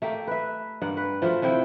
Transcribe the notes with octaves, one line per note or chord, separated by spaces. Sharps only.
A3 A#3 G4
B4 E5
G2 A#3 F#5
B4
F3 A3 F4 F#4
C3 F3 E4 G5